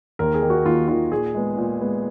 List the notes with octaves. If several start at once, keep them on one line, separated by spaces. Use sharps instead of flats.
D#2 A#4
G#4
D#3 A#3
F#4
D#2 F4
D#3 A#3 F4
A#2 G#4
G#3 B3
A#2
G#3 B3